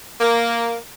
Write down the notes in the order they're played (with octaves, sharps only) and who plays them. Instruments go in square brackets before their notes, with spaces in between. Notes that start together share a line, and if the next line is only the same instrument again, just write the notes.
[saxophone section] A#3